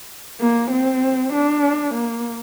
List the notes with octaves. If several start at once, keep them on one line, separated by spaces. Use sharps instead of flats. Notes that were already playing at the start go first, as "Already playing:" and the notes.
A#3
C4
D4
A#3